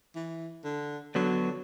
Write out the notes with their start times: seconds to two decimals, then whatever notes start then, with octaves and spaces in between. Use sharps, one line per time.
0.15 E3
0.64 D3
1.15 D3 F#3 B3